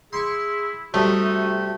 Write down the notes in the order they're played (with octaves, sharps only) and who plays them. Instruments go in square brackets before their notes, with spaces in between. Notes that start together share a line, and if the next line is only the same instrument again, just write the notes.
[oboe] E4 [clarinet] G#4 [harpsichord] C6 C#6
[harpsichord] C3 G3 [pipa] A3 [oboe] D#4 [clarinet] F#4